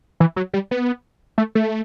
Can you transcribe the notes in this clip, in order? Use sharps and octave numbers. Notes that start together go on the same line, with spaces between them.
E3
F#3
G3
B3
A3
A3